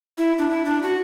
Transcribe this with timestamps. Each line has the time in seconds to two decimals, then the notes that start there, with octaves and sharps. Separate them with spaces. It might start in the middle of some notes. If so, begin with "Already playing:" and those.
0.18 E4
0.38 D4
0.50 E4
0.65 D4
0.83 F#4